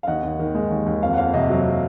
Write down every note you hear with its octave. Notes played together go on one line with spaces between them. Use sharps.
F5
D#2 D#5 F#5
D#2
D#3
G#3
D#2
D#2
F2 F5
F#5
F2 F5
C3 D#5
F#3